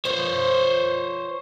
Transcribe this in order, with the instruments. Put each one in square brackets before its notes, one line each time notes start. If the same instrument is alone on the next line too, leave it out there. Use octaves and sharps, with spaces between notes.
[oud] F3 [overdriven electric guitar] C5 C#5